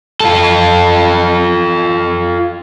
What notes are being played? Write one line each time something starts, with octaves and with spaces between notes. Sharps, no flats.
F4 A4